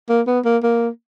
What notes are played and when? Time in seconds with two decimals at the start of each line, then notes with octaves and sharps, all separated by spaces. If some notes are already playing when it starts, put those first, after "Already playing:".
0.09 A#3
0.27 B3
0.45 A#3
0.63 A#3